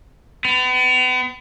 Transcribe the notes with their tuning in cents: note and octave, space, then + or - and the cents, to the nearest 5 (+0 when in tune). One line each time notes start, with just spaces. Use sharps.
B3 +40